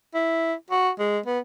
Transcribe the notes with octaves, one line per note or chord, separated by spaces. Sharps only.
E4
F#4
G#3
B3